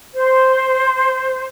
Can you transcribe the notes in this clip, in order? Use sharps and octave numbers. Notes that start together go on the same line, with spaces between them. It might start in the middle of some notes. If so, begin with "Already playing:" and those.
C5